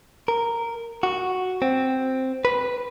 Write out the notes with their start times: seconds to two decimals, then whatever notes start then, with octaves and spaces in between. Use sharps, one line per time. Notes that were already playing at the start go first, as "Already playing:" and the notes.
0.28 A#4
1.03 F#4
1.62 C4
2.45 B4